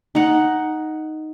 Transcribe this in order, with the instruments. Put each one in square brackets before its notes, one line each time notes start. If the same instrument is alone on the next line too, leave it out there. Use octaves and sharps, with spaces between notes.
[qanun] D#4 F#5